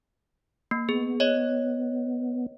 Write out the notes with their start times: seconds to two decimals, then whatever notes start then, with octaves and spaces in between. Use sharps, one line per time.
0.71 A#3
0.89 B3 G#4
1.20 C#5 D#5